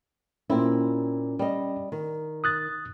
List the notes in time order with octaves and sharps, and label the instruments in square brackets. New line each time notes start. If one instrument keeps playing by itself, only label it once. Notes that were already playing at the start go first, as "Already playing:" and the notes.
[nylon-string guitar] A#2 C4 E4 [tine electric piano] C#4
[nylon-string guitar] G3 D#5
D#3
[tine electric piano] D#6 F#6 A6